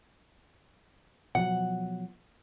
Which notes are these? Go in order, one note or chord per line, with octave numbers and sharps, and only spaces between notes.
B2 F3 F#3 F#5